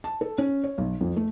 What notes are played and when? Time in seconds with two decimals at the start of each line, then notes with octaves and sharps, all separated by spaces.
0.04 A5
0.21 A4
0.38 C#4
0.64 C#5
0.78 B1
1.01 F2
1.16 A3